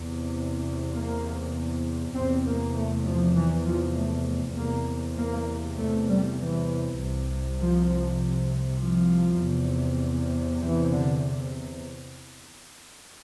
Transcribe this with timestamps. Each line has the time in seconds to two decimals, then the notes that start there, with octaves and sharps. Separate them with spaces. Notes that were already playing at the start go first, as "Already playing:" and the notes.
Already playing: E2 C3
0.93 A#3
2.15 E2 C3 C4
2.46 A#3
2.75 A3
3.05 F3
3.36 E3
3.66 F3
3.97 A3
4.57 E2 C3 A#3
5.17 A#3
5.78 A3
6.08 G3
6.38 E3
6.99 C2 C3
7.59 F3
8.81 F3
9.41 E2 C3
10.63 E3
10.92 D3